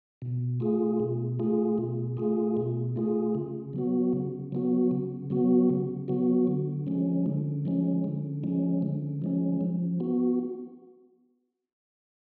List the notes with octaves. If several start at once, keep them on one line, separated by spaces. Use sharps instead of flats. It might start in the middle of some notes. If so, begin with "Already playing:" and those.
B2
A3 F4 G#4
B2
A3 F4 G#4
B2
A3 F4 G#4
B2
A3 F4 G#4
C#3
F#3 B3 F#4
C#3
F#3 B3 F#4
C#3
F#3 B3 F#4
C#3
F#3 B3 F#4
D3
F3 G#3 C#4
D3
F3 G#3 C#4
D3
F3 G#3 C#4
D3
F3 G#3 C#4
F3
B3 F#4